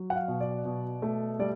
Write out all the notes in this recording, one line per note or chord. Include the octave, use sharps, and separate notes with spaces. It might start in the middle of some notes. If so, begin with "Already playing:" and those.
Already playing: F#3
F#5
F5
B2
D5
B2
A3
G3 D5